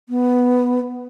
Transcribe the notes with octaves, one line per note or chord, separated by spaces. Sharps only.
B3